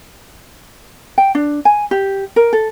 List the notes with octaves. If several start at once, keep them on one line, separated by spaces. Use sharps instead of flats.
G5
D4
G#5
G4
A#4
A4